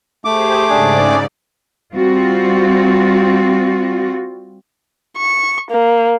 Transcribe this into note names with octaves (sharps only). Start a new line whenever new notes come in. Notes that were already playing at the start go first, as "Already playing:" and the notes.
A3 G4 G#4 C5 D6
G#2 C#3 D4 G#4 D5
G3 C4 F4 F#4
C#6
A#3